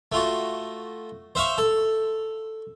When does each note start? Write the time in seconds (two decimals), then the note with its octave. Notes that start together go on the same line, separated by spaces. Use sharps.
0.12 A3 F4 F#4
1.35 C5 E5 F5 C#6
1.58 A4